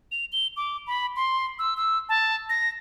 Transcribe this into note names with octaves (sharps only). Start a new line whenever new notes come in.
F7
G7
D6
B5
C6
E6
E6
A5
A#6